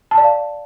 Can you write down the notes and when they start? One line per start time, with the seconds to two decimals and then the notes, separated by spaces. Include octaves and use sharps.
0.11 A5
0.18 D5
0.24 F5